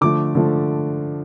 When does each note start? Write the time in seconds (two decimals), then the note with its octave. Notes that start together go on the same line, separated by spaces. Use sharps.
0.01 D3 F3 A3 D6
0.35 D3 F3 A3